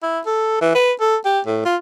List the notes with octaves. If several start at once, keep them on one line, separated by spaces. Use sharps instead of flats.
E4
A4
E3
B4
A4
G4
A2
F4